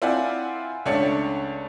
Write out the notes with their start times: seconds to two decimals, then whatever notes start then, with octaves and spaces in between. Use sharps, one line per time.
0.02 C4 E4 F4 D5 F#5 G#5
0.86 C#2 A3 C#4 D4 C#5 C#7